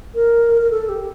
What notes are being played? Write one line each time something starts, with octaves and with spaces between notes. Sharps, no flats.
A#4
A#4
A4
G4